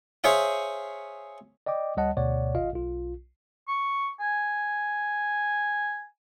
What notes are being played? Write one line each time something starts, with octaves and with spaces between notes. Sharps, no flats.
G#4 C5 C#5 E5 F5
D5 D#5 G5 D6
D2 G3 C#5 D#5 F#5 A5
D2 B2 C#5 D5 F#5
G#1 F4 D#5 F5
B1 F4
C#6
G#5